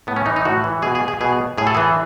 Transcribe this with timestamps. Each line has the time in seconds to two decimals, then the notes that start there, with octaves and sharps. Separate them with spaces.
0.07 A2 B3
0.16 C#4
0.26 E3 D#4
0.36 D#4
0.45 A2 F#4
0.64 E3
0.82 B2 G#4
0.95 G#4
1.08 G#4
1.21 B2 G#4
1.58 A2 G#4
1.67 A4
1.75 E3 G#4